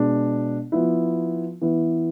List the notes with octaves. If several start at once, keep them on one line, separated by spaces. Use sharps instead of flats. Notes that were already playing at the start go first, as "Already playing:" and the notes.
Already playing: B2 G#3 D4
F3 B3 E4
E3 B3 E4